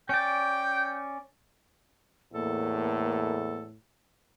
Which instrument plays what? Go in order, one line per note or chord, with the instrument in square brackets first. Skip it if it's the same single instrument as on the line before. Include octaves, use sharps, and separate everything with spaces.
[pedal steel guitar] C#4 D5 [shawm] G5
[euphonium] E2 [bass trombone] A2 [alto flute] A#3 [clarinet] A4